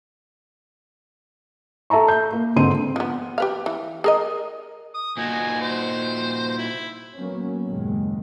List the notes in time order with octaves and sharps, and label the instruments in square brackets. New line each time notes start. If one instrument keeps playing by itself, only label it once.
[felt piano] A4 E5 A5 A#5 C#6
G6
A#3
G1 G#2 D3 C4 C6 D#7
[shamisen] F3 B3
G4 B4 F5
E3
G#4 A#4 D#5
[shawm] D#6
[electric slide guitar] A#2 D#4 F#4 [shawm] G#5
[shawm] C5
E4
[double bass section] F#3 A#3 B3 C#4
F#1 D#2 A#2 G#3